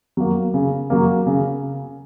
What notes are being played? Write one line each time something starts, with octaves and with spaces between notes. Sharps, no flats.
F#3 A#3
C#3
F#3 A#3
C#3